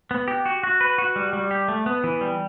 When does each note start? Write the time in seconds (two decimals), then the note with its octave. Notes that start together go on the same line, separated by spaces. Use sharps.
0.11 B3
0.28 G4
0.46 F#4
0.63 F#4
0.81 B4
0.98 F#4
1.16 G3
1.33 G3
1.51 G4
1.68 A3
1.86 B3
2.04 E3
2.21 G3